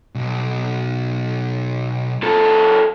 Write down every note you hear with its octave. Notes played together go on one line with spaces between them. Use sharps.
B1
F#2 A4